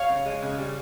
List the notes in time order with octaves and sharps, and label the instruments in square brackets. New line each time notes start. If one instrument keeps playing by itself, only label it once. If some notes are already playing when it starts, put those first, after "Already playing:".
Already playing: [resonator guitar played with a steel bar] C#5 F5
C#3
G#3
C#3
G3